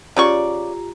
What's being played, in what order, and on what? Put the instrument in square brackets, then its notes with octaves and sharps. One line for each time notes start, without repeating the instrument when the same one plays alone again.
[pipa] C#3 D5 C#6 [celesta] F4 G4 A#5